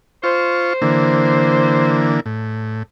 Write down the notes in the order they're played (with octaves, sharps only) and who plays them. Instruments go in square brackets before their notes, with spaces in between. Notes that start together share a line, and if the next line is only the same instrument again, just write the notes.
[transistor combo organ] F4 C#6 [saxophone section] C5
[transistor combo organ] D3 E3 A#3
A2